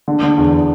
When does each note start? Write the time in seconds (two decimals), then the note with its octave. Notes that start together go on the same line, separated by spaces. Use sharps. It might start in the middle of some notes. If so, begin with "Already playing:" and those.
0.08 D3
0.23 D3
0.38 E2